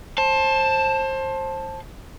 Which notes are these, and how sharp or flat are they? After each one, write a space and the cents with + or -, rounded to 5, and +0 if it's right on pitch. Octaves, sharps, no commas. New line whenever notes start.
C5 +25 A5 +0